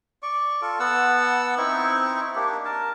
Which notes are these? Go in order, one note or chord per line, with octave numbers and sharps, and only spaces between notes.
D5 C#6
F4 A4
B3 F#5 A5 E6
C4 D#4 E4 C#6
A#3 D4 G4
A#4 A5